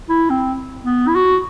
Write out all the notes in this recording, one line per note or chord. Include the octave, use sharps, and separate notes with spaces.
E4
C4
B3
E4
F#4